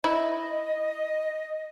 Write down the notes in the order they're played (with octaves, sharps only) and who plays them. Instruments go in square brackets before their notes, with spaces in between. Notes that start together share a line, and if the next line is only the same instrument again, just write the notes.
[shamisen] E4 [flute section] D#5